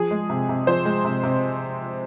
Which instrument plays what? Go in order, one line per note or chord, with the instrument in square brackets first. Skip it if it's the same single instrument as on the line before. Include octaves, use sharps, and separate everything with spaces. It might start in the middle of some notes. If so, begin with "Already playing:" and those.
Already playing: [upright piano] F3 G#4
G#3
C3
C3
F3 C5
G#3
C3
C3